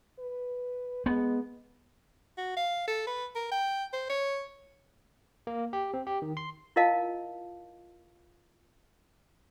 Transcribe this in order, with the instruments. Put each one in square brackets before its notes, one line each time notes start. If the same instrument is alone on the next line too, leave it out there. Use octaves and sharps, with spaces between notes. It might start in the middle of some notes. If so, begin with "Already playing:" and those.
[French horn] B4
[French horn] G#3 [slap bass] B3
[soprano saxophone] F#4
F5
A4
B4
A#4
G5
C5
C#5
[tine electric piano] A#3
G4
C4
G4
D#3
C6
[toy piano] E4 F4 A#4 D#5 F5 A5